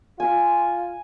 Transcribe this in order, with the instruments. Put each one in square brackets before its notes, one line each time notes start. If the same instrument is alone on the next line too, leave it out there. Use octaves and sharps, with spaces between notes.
[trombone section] F4 [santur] G#5